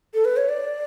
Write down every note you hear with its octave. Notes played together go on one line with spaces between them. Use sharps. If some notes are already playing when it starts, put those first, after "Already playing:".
A4
B4
C#5
D5